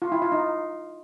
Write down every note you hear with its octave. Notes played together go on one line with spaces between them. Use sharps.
F4
E4
F4
D#4